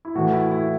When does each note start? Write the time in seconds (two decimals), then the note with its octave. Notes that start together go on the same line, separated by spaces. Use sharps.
0.05 E4
0.15 A2 E3 A3 F#4
0.33 E4
0.51 E4